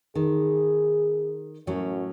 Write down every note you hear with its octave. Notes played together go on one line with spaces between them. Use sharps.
D#3 G#4
F#2 A2 F#3 C#4